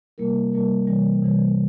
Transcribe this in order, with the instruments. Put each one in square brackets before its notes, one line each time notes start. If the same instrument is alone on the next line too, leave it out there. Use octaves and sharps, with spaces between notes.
[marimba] C3 G3 A#3 E4 A#4
C3 G3 A#3 E4 A#4
C3 E3 G3
C3 E3 G3